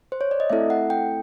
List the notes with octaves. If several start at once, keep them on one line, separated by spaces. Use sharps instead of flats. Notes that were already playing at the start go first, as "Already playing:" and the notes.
C5
C#5
D5
D#5
A3 C4 E4 A4 E5
F#5
G5